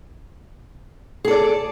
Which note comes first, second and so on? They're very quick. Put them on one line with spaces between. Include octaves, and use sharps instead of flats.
G#4 A4 D5